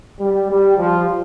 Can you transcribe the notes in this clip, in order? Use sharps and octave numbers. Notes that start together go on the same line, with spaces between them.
G3
G3
F3